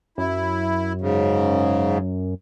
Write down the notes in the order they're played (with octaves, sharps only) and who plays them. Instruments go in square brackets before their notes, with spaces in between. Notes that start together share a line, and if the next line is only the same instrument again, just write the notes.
[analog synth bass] F#2 [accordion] E4
[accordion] G#2 C#3